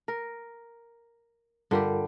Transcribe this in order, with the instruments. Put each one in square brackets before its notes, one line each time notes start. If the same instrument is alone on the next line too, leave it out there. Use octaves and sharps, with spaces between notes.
[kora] A#4
[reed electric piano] G2 F4 A#4 [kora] D3 G3 G4